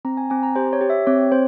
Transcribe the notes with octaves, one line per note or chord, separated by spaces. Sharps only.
C4 A#5
G#5
C4 G#5
A#5
G4 C5
C#5
G4
E5
C4 C#5
C4 C5